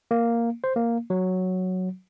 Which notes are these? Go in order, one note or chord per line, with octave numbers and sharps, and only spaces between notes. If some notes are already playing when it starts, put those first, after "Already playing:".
A#3
C5
A#3
F#3